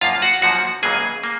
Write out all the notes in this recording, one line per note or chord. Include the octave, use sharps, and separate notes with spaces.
F#2 F3 A#3 F4 F5
F#4 F#5
F#2 F3 A#3 F#4 F#5
C#2 C#3 F#3 A#3 G#4 G#5
A#3